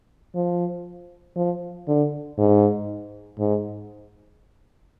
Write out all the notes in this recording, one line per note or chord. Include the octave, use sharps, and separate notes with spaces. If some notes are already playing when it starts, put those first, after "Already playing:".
F3
F3
D3
G#2
G#2